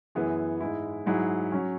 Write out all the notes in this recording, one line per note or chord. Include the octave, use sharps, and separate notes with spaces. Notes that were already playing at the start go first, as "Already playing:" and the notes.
F#2 E3 B3 E4 G#4
G#2 G#3 E4
G#2 F#3 E4 G#4
F#3 C#4